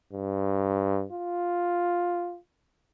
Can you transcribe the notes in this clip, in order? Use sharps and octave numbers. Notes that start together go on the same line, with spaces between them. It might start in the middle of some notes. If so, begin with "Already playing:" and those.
G2
F4